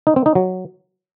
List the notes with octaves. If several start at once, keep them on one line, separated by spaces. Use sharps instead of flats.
D#4
C4
D#4
F#3